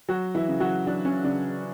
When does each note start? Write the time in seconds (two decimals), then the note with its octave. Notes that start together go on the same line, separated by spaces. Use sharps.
0.09 F#3 F#4
0.35 E3 E4
0.48 C#3
0.60 F#3 F#4
0.87 F#3 D4
1.05 C#4
1.24 C#3 D4